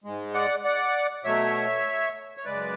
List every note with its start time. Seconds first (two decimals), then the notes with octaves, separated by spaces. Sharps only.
0.04 G#2 G#3
0.34 D5 F#5
0.65 D5 F#5
1.24 B2 F#3 A3 C#5 E5
2.37 C#5
2.45 F#2 C#3 G#3 B4 D5